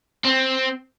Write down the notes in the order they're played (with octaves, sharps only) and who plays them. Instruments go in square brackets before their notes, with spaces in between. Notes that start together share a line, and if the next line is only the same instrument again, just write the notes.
[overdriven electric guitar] C4